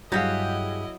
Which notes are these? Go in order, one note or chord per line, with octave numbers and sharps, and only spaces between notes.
G2 F#3 E4 G4 G#4 D#5 F5 F#5